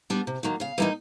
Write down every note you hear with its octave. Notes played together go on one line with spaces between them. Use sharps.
G3 B3 D4
C3
D#3 F#3 A#3
C#3 F5
E3 G3 A#3 D#4